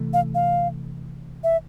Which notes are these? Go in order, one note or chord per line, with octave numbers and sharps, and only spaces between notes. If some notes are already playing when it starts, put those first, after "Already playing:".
Already playing: C3 E3 A3
F5
F5
E5